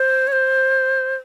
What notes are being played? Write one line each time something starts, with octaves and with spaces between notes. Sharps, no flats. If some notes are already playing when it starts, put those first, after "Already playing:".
Already playing: C5
C#5
C5